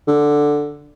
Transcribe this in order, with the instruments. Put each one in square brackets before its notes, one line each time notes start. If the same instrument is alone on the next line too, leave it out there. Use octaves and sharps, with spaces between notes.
[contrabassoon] D3